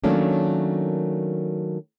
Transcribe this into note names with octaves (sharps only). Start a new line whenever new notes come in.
D#3 F#3 A3 A#3 C#4 D4